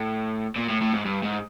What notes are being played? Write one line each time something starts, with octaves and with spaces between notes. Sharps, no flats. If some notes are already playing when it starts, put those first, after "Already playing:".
Already playing: A2
A#2
A2
A2
G#2
G2
G#2